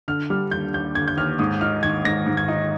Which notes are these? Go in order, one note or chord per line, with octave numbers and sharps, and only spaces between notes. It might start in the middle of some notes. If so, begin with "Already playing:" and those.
D3 F6
G3 F6
D#2 G6
D#2 G6
D3 G#6
G6
D#2 F6
G#2 D#6
D#4 F6
D#3 G#6
G#2 A#6
G#2
G#6
D#4